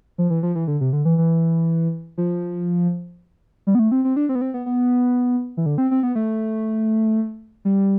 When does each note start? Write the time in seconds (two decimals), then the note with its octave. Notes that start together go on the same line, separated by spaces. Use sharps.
0.18 F3
0.30 E3
0.43 F3
0.55 E3
0.68 D3
0.81 C3
0.93 D3
1.05 E3
1.18 E3
2.18 F3
3.67 G3
3.75 B3
3.79 A3
3.92 C4
4.05 C4
4.16 D4
4.29 C4
4.35 B3
4.41 C4
4.54 B3
4.66 B3
5.57 E3
5.66 D3
5.78 C4
5.91 C4
6.03 B3
6.15 A3
7.65 G3